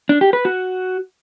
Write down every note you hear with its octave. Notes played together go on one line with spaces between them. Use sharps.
D4
G4
B4
F#4